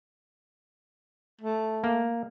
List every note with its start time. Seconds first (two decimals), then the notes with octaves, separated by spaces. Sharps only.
1.41 A3
1.84 A#3